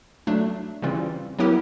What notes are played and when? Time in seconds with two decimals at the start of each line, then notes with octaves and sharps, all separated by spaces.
0.27 F#3 A3 D4
0.82 C#3 E3 G3 C4 F4
1.39 F#3 B3 E4 G4 A#4